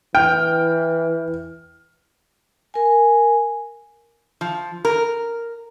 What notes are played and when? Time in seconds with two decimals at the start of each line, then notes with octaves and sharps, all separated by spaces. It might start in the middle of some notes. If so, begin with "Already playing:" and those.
0.15 E3 G5 F6
2.74 A#4 G#5
4.41 F3
4.85 A#4